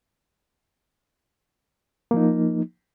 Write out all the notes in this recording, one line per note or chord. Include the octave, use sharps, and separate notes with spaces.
F3 A#3 D#4